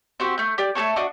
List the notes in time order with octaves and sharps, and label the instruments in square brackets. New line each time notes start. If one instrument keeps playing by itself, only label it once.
[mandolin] C4 F#4 G4
A3 G6
G4 D5
A3 G#4 A4 C#5
D4 F#4 D#5